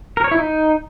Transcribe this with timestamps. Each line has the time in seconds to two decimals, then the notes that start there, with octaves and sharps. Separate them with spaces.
0.17 A#4
0.24 C#5
0.31 E4
0.39 D#4